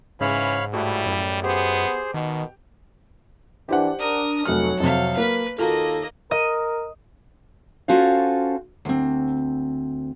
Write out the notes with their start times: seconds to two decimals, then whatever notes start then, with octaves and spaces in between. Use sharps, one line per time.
0.21 G#2 C#3 E3 C#5 F5 B5
0.73 A2 G3 E4 F#4 A5
1.06 F#2
1.44 B3 G4 G#4 C5
2.14 B2 D#3
3.69 E3 D4 G4 C5 F#5
3.99 D4 A#4 D#6
4.45 F1 F#3 A3 F#5 F6
4.80 F2 C3 A4 F5
5.17 A#3 B4
5.59 D#2 A#3 F4 F#4 A4 D#5
6.31 A#4 D#5 D#6
7.88 C#4 F4 F#4 A4 C5 F5
8.85 D2 C4